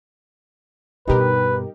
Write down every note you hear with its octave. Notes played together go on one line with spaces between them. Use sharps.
G2 B2 D#4 G4 A#4 B4